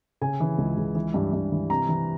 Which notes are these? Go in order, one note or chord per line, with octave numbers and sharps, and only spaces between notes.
C#3 G#5
E3
C#2
C#2
E3
G2
G2
E3
C3 A#5
E3